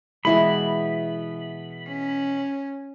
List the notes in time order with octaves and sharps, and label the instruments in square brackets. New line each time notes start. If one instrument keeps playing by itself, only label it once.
[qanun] B2 E3 D#5 [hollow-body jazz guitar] G#3 E4 [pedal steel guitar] B5
[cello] C#4